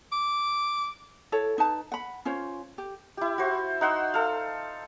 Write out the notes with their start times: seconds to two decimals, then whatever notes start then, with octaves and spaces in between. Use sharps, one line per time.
0.12 D6
1.32 E4 A4 C#5
1.58 D#4 B4 A5
1.92 F#5 B5
2.25 C#4 F4 C5 C#5
2.78 G4
3.17 E4 G4
3.38 F#4 C5
3.81 D#4 F#5 C6 E6
4.14 A4 F5